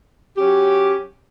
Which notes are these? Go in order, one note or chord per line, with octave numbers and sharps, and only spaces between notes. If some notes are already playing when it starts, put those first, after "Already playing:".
F#3 C#4 G4